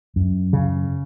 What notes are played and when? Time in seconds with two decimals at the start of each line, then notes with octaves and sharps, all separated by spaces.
0.16 F#2
0.53 C#3